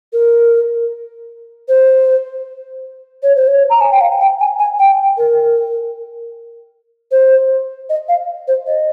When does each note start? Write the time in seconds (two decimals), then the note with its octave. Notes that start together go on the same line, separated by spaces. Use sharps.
0.13 A#4
1.68 C5
3.23 C#5
3.36 C5
3.47 C#5
3.70 A#5
3.81 G#5
3.91 G5
4.01 F5
4.20 G5
4.40 G#5
4.59 G#5
4.79 G5
5.18 A#4
7.11 C5
7.89 D#5
8.08 F5
8.48 C5
8.67 D#5